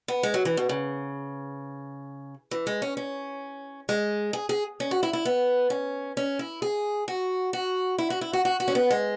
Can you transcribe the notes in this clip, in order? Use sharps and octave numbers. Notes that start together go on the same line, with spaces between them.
B3
G#3
F#3
E3
B2
C#3
E3
G#3
C#4
C#4
G#3
G#4
G#4
C#4
F#4
E4
E4
B3
C#4
C#4
E4
G#4
F#4
F#4
E4
F#4
E4
F#4
F#4
F#4
C#4
B3
G#3